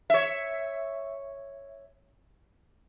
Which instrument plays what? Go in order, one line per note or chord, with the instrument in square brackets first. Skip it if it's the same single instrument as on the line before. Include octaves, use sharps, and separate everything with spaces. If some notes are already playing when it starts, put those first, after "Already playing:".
[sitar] C#5 E5